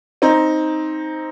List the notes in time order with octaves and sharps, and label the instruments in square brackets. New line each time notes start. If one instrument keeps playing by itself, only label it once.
[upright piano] C4 D#4